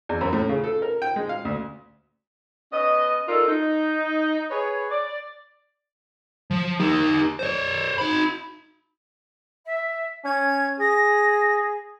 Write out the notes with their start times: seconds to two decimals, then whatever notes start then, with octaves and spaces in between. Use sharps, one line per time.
0.09 E2
0.21 F#2
0.33 A2
0.49 C#3
0.64 A4
0.82 A#4
1.02 G5
1.16 G#3
1.29 F5
1.45 D2
2.72 B3 C#4 D#5
3.28 D4 D#4 F4 A4 A#4
3.48 D#4
4.50 G#4 B4 C#5
4.90 D5
6.51 F3
6.80 D#4 G4
7.39 C5 C#5
7.98 D#4 B5
9.65 E5
10.25 C#4 G#6
10.80 G#4 A#6